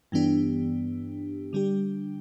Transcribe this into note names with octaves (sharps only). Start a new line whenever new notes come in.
G2 E3 B3 D4 G4
D3 G3 D4 G4